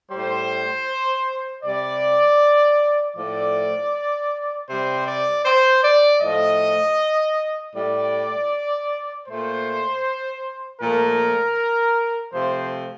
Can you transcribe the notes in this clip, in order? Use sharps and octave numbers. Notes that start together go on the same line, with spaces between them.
A2 G3 C5
C3 G3 D5
A2 F3 A3 D5
C3 G3 C5
D5
C5
D5
A2 F3 A3 D#5
A2 G3 D5
A#2 A3 C5
A#2 F3 A3 A#4
C3 F3 A3 C5